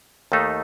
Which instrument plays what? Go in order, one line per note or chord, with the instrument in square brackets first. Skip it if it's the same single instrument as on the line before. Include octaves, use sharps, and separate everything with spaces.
[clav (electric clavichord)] D#2 D#3 A3 D#4 A4